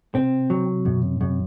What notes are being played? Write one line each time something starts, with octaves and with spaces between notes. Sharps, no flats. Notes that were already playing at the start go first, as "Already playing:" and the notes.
C3 C4
F#3
F#2 B2
C3
F#2 C3